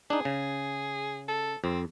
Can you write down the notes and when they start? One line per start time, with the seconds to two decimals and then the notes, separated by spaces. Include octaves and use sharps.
0.10 D4 D#4 G#4
0.25 C#3
1.28 A4
1.64 F2 C4